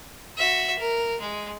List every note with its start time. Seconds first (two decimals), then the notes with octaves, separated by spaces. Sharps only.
0.38 F#4 E5
0.79 A#4
1.21 G#3